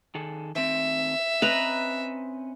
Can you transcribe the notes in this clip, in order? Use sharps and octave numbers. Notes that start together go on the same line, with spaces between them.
D#3 G#4 A4
D#3 A3 C4 E5
C4 C#4 B4 D#5 A#5